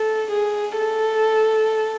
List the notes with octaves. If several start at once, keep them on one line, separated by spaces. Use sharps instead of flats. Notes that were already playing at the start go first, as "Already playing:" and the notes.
Already playing: A4
G#4
A4